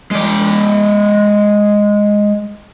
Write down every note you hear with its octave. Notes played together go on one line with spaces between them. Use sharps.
G#3 D5